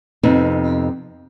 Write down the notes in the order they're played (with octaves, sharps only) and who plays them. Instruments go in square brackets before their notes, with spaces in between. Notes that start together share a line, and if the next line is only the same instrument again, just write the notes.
[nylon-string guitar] F2 C3 B3 D#4